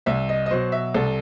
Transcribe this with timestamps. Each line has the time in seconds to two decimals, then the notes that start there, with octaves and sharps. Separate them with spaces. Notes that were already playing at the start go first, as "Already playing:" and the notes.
0.06 C2 E5
0.29 D#5
0.46 D#5
0.51 B2 F#3 C5
0.72 E5
0.94 C2 A4